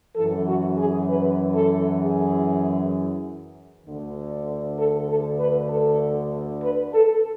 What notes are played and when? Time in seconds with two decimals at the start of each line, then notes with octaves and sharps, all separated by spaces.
0.16 F#2 E3 A4
0.47 F#4
0.78 G#4
1.08 B4
1.55 A4
2.01 G#4
3.86 D2 D3
4.78 A4
5.09 A4
5.39 B4
5.70 A4
6.63 B4
6.93 A4